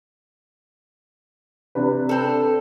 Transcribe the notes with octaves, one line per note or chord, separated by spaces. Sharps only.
C3 D4 B4
C4 A4